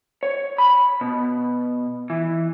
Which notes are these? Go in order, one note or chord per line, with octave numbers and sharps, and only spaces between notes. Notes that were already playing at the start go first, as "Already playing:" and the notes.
C#5
B5
B2
E3